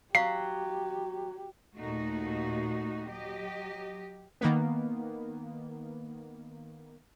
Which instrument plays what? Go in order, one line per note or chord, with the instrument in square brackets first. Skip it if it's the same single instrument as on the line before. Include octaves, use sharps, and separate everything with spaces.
[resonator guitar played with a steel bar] F#3 [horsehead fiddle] G4 [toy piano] F5 [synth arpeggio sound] C7
[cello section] D#2 A#2 A3 D#4 F#4
F#3 G4 D#5
[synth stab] D#3 A#3 B3